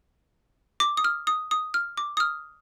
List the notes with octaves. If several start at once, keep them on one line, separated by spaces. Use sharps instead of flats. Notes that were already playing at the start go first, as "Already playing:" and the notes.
D6
D#6
F6
D#6
D#6
F6
D6
D#6
F6